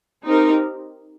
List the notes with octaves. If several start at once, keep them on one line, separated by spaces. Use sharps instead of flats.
C4 D#4 G4 A#4